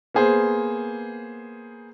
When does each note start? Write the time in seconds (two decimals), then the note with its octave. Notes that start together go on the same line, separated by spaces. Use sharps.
0.14 A#3 B3 G#4 C5